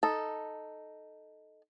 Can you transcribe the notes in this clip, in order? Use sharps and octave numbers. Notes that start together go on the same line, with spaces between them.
D#4 A4